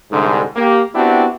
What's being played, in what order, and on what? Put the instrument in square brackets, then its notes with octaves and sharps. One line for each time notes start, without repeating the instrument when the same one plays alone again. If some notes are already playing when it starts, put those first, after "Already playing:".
[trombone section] C2 G#2 D3
A#3 G4
B3 C4 D4 E4 F#4 G4